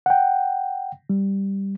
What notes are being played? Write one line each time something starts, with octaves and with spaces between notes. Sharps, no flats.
F#5 G5
G3